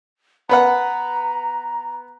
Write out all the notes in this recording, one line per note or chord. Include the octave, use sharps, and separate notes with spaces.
B3 B4 F#5 A#5